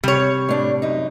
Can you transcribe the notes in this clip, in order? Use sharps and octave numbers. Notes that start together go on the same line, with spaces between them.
C3 G3 C#5
A2 D4
F#2 D#4